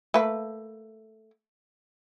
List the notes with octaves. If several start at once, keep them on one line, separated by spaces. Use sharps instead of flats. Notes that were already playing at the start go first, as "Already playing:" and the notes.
A3 A#3 B4